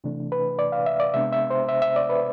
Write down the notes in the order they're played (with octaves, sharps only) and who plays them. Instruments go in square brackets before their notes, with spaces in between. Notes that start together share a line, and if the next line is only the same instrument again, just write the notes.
[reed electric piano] C3 E3 A3 D4
B4
D5
F5
E5
D5
C3 G#3 B3 D4 E5
E5
C5
E5
E5
D5
B4